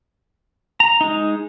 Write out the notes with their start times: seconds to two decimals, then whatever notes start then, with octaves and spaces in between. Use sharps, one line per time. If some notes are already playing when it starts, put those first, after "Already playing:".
0.80 A#5
1.01 G#3 D#4